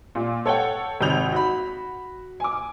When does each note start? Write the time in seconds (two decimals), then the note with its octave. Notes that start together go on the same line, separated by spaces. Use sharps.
0.15 A#2
0.46 A4 C#5 F#5 G5
1.01 G#1 C3 G6 F7
1.32 F#4 B5
2.40 G#5 D6